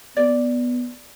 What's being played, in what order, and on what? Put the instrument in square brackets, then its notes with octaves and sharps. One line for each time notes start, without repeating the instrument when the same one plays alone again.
[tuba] B3 [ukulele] D5